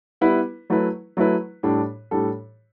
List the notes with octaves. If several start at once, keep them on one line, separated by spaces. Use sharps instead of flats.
G3 B3 E4 B4
F#3 A3 E4 B4
F#3 A3 E4 B4
A2 G3 D4 A4
A2 G3 D4 A4